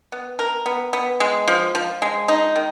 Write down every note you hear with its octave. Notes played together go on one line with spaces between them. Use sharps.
B3
A#4
B3
B3
G#3
F3
F3
G#3
D#4
D#3